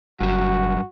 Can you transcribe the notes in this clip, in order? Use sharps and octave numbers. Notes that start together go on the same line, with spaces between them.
F#1 G2 F#3 F#4